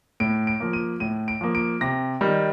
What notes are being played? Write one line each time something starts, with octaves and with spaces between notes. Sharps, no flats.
A2 D7
D7
F3 A#3
D#7
A2 D#7
D7
F3 A#3
D7
C3 A#6
D#3 G3